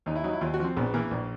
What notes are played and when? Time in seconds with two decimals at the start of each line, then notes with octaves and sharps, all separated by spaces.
0.06 D#2 D#4
0.16 E4
0.24 F#3 D#4
0.33 E4
0.41 D#2 F4
0.54 F#4
0.60 F3 C4
0.76 A#1 B3
0.94 E3 A#3
1.11 A#1